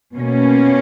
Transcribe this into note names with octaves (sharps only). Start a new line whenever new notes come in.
B2 A#3 C#4